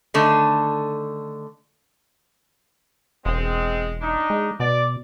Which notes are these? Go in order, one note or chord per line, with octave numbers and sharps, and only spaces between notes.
D3 D#3 A3 D4
E1 G#3 C4
D4 D#4
G#3
B2 D5